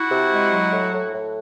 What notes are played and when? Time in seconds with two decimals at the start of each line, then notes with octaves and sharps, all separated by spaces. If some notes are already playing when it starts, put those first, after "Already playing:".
Already playing: E4 F#4
0.08 C3
0.30 G#3
0.51 F#3
0.71 A2
0.92 A2
1.13 A2